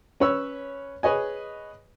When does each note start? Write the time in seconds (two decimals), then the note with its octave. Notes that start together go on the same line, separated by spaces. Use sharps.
0.20 C#4 B4 C#5 E6
1.03 G#4 B4 C#5 D#5 G#5